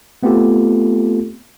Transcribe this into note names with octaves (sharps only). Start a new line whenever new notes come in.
A3 B3 C4 F4 G4 A4